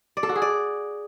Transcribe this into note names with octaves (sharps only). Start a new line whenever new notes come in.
D5
A4
F#4
G#4
D5